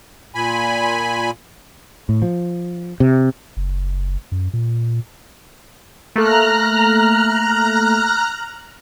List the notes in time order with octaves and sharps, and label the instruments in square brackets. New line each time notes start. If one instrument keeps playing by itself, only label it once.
[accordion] A#2 G#5 B5
[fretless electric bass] A2
F3
C3
[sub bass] F#1
F#2
A#2
[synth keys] A3 A#3 A4 [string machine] A#5 F6 F#6